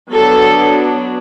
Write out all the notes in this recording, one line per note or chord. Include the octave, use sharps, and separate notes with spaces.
F#3 B3 D4 A4